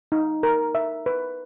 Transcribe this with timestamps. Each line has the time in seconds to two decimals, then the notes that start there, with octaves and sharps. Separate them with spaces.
0.12 D#4
0.43 A#4
0.75 E5
1.06 B4